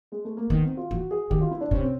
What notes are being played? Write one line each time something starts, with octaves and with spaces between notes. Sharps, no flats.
G#3
A3
A#3
D#3 B3
C4
F4
E3 F#4
G#4
D#3 G4
F4
E4
D4
C3 C#4
C4